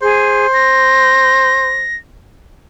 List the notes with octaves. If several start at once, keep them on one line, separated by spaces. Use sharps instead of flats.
G#4 C5
A#6